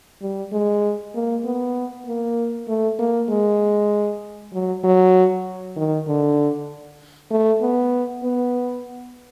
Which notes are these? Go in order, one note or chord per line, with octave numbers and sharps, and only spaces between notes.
G3
G#3
A#3
B3
A#3
A3
A#3
G#3
F#3
F#3
D#3
D3
A3
B3
B3